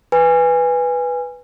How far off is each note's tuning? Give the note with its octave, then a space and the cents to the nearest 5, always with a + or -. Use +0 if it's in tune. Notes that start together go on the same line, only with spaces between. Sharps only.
B4 +0 G#5 -15